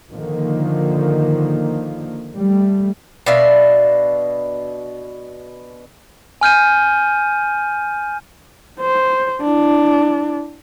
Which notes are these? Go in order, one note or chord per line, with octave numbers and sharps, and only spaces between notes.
D3 D#3 F3 A#3
G3 A3
B2 D4 E5 F5
G#5 F6 G6 D#7
C5
D4 E4